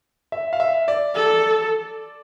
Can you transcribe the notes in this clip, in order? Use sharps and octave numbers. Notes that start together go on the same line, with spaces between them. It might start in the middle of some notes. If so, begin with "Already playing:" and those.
E5
F5
E5
D5
A4